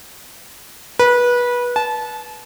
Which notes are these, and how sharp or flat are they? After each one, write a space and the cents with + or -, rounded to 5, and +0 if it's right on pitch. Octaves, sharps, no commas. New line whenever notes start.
B4 -25
A5 -25